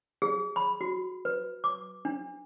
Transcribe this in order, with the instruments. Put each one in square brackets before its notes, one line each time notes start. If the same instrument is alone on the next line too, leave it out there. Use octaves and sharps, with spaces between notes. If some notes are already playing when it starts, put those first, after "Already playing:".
[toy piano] G#4
B5
F#4
B4
D6
D4